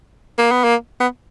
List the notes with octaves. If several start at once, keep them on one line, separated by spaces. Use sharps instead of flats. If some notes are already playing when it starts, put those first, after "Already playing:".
A#3
B3
A#3
B3